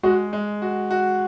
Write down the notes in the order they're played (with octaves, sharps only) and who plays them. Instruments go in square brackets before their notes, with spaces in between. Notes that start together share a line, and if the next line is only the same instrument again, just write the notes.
[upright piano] G#3 [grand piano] F#4
[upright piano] G#3
F#4
F#4